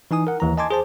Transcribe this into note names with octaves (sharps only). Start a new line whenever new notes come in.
E3 D#4 G#5 D#6
A#4 F#5
D#2 E3 A#5
D#5 G#5 A5 C6 D6 G#6
G#4 C5 A5